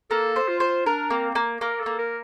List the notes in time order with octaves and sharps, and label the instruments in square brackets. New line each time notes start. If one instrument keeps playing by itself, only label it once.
[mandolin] A#3 [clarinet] A4
[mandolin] C5
[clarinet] F4
[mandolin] C5
[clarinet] D4 [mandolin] A#4
[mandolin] A#3 [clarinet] C4
[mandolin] A#3
[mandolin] A#3 [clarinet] A#4
[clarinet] A4
[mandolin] A#3
[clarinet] A#4